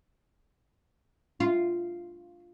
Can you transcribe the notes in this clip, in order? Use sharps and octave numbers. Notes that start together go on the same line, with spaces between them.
F4